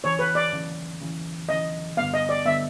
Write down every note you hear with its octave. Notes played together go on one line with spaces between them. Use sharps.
E2 C#3 E3 C#5
B4
D5
E2 C#3 E3
E2 C#3 E3
E2 C#3 E3 D#5
G2 D3 G3 B3 F5
D#5
D5
D3 G3 B3 E5